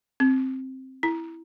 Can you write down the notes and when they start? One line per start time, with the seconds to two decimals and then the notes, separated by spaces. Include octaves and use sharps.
0.20 C4
1.03 E4